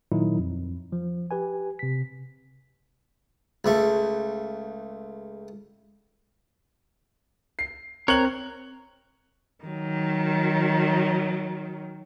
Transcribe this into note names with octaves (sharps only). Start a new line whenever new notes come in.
A#2 D#3 F#3 D#4 E4
F2
F3
G4 B4 G#5
C3 B6
C#2 A3
C7
C4 A#4 C#5 F#6 F#7
D#3 F#3